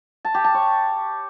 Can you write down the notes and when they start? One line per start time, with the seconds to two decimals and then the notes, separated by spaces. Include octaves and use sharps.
0.25 A5
0.34 G4
0.44 A5
0.54 C#5